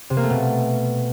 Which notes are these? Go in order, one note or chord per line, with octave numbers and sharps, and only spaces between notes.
C3
A#3
A3
B2